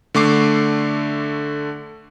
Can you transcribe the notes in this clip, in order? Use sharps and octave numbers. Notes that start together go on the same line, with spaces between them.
D3 A3 C#6 D6 C7